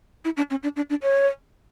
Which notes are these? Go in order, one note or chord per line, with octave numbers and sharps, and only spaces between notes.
E4
D4
C#4
D4
D4
D4
C#5